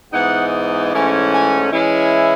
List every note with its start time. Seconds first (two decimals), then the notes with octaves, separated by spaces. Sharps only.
0.12 G#2 E3 B3 D#4 F#5
0.93 G#2 E3 A3 C#4
1.32 G#5
1.72 E3 G#3 C#4 E4